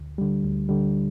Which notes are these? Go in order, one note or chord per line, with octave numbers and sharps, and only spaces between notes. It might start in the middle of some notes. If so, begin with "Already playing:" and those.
Already playing: D2
D3 G3
D2
D3 G3